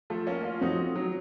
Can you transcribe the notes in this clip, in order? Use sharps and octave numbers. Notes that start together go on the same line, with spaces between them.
F3 A3
A#3 C#4
C#4 F4
F3 A3 C4 D#4 F#4
F#3